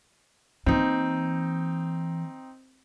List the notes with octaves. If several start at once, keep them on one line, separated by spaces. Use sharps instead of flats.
E3 A#3 C4 D#4